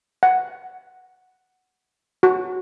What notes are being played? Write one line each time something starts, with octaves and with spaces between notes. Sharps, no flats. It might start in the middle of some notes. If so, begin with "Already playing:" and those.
F#5
F#4